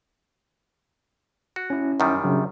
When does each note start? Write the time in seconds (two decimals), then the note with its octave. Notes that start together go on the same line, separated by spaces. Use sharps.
1.56 F#4
1.70 C#4 E4
2.00 F#2 D#3 G3
2.24 C#3 F#3 D4